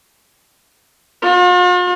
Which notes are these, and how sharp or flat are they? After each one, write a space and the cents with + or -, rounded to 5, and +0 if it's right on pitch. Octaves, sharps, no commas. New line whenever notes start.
F4 +45